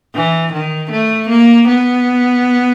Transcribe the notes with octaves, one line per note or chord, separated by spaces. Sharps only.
E3
D#3
A3
A#3
B3